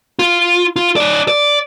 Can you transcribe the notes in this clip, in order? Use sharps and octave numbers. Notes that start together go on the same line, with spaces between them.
F4
F4
D#4 D5
D5